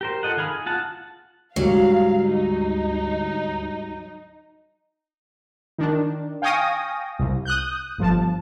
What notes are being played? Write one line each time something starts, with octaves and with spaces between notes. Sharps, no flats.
G4 A#4 C5
F4 A4 D#5 F#5
D#3 G#4 F5 B5
G#4
F4 F#5 A5
D2 G#2 E3 F#3 G3 F5
D#4
D#3 D4
F5 G5 G#5 C#6 D#6 A#6
C2
D#6 F#6 G6
G1 F3 A5